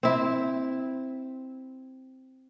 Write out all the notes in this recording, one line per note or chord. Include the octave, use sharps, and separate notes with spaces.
C4 E4